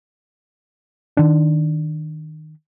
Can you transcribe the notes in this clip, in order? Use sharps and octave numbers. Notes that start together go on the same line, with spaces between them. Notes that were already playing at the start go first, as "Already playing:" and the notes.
D#3 D4